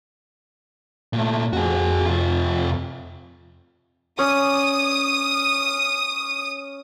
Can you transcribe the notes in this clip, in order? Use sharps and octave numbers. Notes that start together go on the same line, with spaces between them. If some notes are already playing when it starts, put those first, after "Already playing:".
A#2 A3
F2 F#4 G#4
C3 F4
C#4 D5 D#6